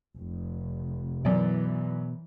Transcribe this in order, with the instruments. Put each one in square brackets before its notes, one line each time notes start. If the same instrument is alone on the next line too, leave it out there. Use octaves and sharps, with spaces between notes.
[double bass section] F1
[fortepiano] F#2 D5 [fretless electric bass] B2 [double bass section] E3